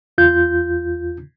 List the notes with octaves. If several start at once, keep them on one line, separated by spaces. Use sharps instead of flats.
E2 F4 G6